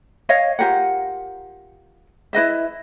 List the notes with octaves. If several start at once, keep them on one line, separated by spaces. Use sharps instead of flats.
C#5 D#5 F5
F4 G4 A#4 F#5
E4 B4 D#5 E5